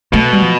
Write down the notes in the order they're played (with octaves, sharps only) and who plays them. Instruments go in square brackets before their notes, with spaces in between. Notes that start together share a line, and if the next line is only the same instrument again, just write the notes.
[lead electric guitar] B2 [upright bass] A3
[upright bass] G3
F3